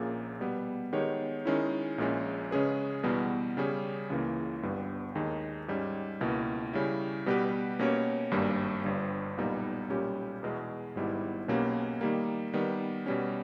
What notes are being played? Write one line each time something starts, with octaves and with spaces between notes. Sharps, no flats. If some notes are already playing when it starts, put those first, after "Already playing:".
Already playing: A#1 A#2 A#3 C#4 G#4
B2 G3 B3
D#3 G#3 B3 G4 C#5
D#3 G#3 C#4 E4
A#1 A#2 G#3 C#4
C#3 G#3 C#4 G#4 B4
E2 B2 G3 B3
C#3 G3 C#4 G#4
C#2 C#3 E3 A#3
G1 G2 G3 B3
D#2 D#3 G#3 D#4
G#2 G3 C#4
C#2 B2 A#3 E4
C#3 G3 C#4 E4
B2 G3 B3 G4 B4
B2 A#3 C#4 G4 C#5
G#1 G2 G3 A#3
G1 G2 G3
B1 A#2 G3 B3 D#4
B1 A#2 G3 C#4 G4
E2 B2 G#3
G#1 G#2 G3 B3 E4
B1 B2 A#3 C#4 G4
D#3 G3 A#3
D#3 G3 B3
B2 G3 C#4